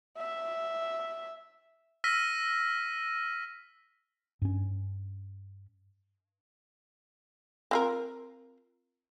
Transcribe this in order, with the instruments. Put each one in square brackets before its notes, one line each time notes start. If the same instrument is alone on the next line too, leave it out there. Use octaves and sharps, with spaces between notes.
[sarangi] E5
[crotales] E6 F6 A#6 B6 D#7
[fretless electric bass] G2 C#4
[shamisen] C4 F4 A#4